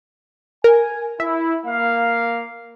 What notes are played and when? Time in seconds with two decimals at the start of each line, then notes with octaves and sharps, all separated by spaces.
0.64 A#4 G#5
1.20 E4 E5
1.66 A#3 F5